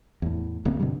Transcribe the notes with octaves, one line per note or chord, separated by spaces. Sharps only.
E2 A2
D1 C#3 A#3 C4
G2 B2 D3 G3